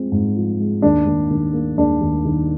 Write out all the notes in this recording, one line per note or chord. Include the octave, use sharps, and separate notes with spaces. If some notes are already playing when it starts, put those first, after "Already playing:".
Already playing: F3 G#3 C4
G#2
F3
G#3
D#2 D4
D#2
D#3
A#3
D#2 D4
D#2
D#3